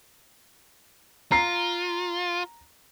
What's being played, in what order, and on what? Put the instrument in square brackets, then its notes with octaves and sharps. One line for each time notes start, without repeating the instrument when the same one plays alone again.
[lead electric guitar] F4 [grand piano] A#5 C7